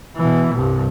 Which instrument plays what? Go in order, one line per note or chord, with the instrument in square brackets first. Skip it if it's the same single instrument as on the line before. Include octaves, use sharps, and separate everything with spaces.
[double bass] B2 E3
C2 G2